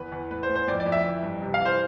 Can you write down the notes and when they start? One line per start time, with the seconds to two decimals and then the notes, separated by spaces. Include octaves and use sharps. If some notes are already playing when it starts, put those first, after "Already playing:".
Already playing: E2 B4
0.12 E2
0.30 A2 B4
0.43 C5
0.49 A2
0.55 C5
0.68 F2 D5
0.80 D5
0.86 F2
0.92 E5
1.05 E3
1.22 G2
1.42 C3
1.54 F5
1.60 E3
1.65 C5